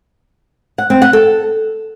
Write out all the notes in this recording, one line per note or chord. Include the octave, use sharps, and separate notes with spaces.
F#5
C4
F#5
A4